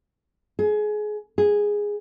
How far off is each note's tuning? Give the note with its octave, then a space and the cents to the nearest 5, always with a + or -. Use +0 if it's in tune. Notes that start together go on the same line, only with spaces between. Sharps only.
G#4 +25
G#4 -5